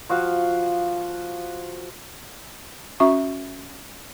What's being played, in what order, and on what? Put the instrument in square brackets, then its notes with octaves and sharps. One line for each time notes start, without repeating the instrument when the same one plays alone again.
[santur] F3 F#4 F5 F#5
[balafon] C#4 F#4 E5 C#6